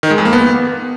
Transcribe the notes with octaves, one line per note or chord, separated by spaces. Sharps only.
D#3
G#3
F2
A#3
B3